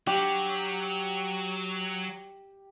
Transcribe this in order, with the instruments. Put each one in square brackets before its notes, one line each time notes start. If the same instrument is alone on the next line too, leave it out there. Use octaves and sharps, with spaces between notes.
[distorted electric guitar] F#3 [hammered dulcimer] G4